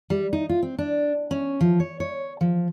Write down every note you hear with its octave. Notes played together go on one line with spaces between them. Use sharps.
G3
D#4
F4
C4
D4
C#4
F3
C#5
C#5
F3